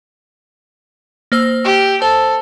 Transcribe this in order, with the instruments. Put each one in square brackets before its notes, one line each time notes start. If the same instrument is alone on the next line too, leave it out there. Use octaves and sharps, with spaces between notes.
[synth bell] A#3 C5 E6
[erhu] G4
[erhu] A4 [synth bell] C5